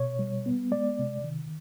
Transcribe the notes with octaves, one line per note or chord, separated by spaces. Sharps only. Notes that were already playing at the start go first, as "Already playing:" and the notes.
Already playing: B2 C#5
G3
B3
G#3 D5
C3
D#3